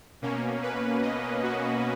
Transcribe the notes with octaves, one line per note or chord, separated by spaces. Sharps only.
B2 A#3 C#4
B4
D#5
F#4